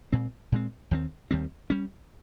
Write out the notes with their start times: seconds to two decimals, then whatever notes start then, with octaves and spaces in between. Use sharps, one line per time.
0.12 A#2 G#3 C4
0.52 A#2 G#3 C4
0.91 D#2 D#3 G3 C4
1.31 D#2 D#3 G3 C4
1.70 G3 C#4